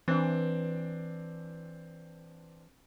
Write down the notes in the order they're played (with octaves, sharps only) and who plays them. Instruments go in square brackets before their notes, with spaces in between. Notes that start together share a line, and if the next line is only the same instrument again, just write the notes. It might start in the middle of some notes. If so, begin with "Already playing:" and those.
[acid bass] E3 [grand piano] C4 D4